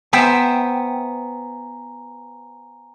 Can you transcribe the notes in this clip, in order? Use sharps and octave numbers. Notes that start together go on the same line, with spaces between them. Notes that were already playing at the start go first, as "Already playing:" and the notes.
B3 C5 E5 G5 G#5 A#5